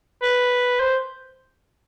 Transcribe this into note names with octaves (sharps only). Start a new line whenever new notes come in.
B4
C5